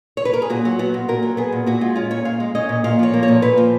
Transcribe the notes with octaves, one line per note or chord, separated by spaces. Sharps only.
C#5
B4
A#4
G#4
A#2 F#4
F#3
B3 F#4
A#2
A#2 A#4
F#3
B3 G#4
A#2
A#2 F#4
G#3 F4
C#4 F4
A#2 C#5
A#2 F5
G#3
C#4 D#5
A#2
A#2 F5
F3 C#5
A#3
C#5
A#2
A#2 B4
F3